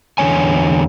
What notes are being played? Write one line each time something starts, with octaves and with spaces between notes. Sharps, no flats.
E2 D3 G#3 C#5 G#5